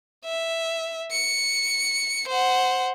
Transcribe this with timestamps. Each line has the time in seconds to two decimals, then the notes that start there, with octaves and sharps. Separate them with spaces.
0.25 E5
1.11 C#7
2.28 C5 F#5